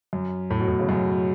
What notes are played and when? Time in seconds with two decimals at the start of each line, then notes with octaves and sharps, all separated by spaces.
0.13 F#2
0.50 A2
0.60 B2
0.68 A2
0.79 C#3
0.89 F#2 B2